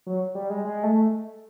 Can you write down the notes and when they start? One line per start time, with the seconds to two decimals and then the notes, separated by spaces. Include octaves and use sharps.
0.06 F#3
0.35 G3
0.50 G#3
0.65 G#3
0.83 A3